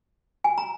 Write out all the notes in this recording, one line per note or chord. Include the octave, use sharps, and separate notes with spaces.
G#5
A#5